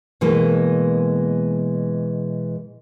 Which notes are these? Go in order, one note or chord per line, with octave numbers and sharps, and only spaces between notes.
B2 E3 G#3 A#3